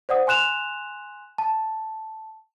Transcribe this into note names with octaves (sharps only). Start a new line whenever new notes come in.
C5 D5 F#5 D#6
G#5 C6 F#6 E7 F7
A5